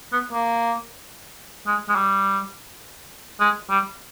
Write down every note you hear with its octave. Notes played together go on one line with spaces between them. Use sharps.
B3
A#3
G#3
G#3
G3
G#3
G3